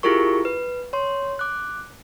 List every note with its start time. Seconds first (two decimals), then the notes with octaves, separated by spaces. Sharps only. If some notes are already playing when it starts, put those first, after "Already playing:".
0.03 E4 F4 G4 G#4 A#4 C#6
0.45 B4
0.93 C#5 C6
1.39 D6 F#6